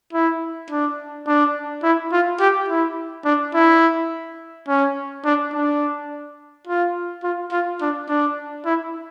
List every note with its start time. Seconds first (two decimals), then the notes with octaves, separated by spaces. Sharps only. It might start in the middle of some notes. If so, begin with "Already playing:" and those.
0.13 E4
0.70 D4
1.27 D4
1.83 E4
2.12 F4
2.40 G4
2.69 E4
3.25 D4
3.55 E4
4.68 C#4
5.25 D4
5.53 D4
6.67 F4
7.23 F4
7.52 F4
7.81 D4
8.09 D4
8.66 E4